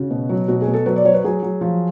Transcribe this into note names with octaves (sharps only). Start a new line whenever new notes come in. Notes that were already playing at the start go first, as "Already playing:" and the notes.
Already playing: C#3 F#4
B2
F#3
B2 F#4
G#4
B2
A4
F#3 B4
D5
F#3 C#5
B4
F#3 G#4
F#3
F3